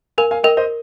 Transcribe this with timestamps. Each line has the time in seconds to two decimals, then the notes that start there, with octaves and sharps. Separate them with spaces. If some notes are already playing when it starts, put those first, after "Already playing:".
0.18 A#4 F5 G#5
0.31 F5 G#5
0.43 A#4 D#5 G5
0.57 C5 D#5